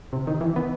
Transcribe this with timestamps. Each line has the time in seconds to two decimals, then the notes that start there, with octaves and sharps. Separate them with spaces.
0.13 C3
0.27 D#3
0.41 E3
0.56 B3